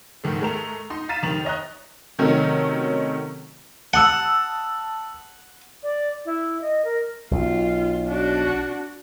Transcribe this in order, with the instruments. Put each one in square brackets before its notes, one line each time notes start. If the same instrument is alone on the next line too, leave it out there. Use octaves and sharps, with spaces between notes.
[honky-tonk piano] G#2 D#3 A3
G#3 A3 A#4 F7
D#4 C6
F5 A#5 A6 B6 D#7 E7
F1 D#3 F7 F#7
C#5 D#5 A#5 F#6
C3 D#3 F#3 A3 C4 C#4
[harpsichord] F#5 [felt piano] A5 D#6 E6
[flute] D5
E4
D#5
A#4
[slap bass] B1 [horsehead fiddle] F4
[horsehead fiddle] D4 F#4